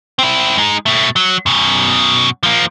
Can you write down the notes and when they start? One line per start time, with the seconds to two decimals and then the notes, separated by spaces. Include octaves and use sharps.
0.19 C4 E4
0.58 G#3 D#4
0.86 B2 A3
1.16 F#3
1.46 F#2 B2
2.43 F3 A#3